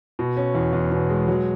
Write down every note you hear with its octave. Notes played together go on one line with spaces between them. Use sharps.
B2
C#4
E2
E2
B2
G#3
F#3